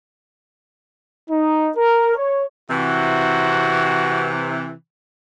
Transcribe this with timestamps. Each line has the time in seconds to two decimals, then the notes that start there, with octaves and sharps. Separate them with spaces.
1.30 D#4
1.77 A#4
2.16 C#5
2.70 C3 E3 F#4